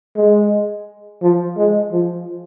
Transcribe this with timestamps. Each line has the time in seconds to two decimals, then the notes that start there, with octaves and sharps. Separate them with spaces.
0.16 G#3
1.22 F3
1.57 G#3
1.92 F3